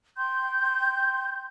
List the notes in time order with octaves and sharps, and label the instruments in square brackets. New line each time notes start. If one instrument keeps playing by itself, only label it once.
[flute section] G5 C6 G6